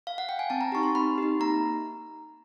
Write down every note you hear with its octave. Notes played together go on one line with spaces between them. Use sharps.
F5
F#5
G5
G#5
C4 A5
A#5
D#4 G4 C#6
C6
C4 B5
D#4 G4
A#3 A#5